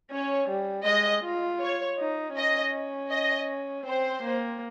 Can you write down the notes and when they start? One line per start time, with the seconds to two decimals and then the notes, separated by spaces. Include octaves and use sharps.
0.11 C#4 C#5
0.49 G3
0.86 G#3 D#5
1.24 F4
1.61 C#5
1.98 D#4
2.36 C#4 D#5
3.10 D#5
3.86 C4 C5
4.23 A#3